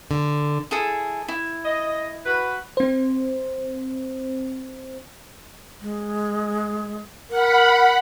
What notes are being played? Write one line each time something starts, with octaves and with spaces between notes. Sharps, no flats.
D3
E4 G#4 A4
E4
D#5
F#4 B4
C4 C5
G#3
A#4 F#5 B5